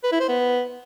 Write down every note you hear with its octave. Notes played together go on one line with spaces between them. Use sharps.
B4
E4
C5
B3